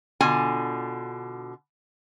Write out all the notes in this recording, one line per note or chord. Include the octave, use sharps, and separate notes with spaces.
B2 D3 F4 G#5